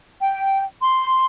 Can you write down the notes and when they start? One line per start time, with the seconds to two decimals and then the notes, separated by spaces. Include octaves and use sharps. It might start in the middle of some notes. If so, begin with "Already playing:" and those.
0.21 G5
0.82 C6